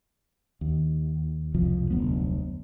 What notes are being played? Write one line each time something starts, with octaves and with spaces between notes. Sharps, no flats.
D#2
E1 C2 F2 F3
F1 D2 F#3 B3